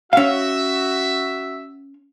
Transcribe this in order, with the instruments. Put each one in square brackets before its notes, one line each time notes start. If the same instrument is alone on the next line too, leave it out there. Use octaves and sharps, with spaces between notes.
[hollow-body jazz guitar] C#4 F5 [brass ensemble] F#4 E5